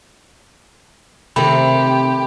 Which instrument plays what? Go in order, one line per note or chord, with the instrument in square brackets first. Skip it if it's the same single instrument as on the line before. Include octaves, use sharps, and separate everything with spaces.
[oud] C3 [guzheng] D#3 A3 [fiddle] G4 [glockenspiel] B5